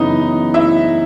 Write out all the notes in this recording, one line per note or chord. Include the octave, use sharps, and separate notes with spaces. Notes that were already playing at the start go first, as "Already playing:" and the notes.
Already playing: F#2 C#3 E3 B3 D#4 D#5
E4 E5